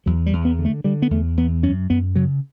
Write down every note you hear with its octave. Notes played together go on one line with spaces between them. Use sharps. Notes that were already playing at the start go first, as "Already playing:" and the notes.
E2 F#3
G3
E2
B3
D3
A3
D3 G3
B3
E2 A3
E2 B3
F#2 C#4
F#2 B3
C#3 F#3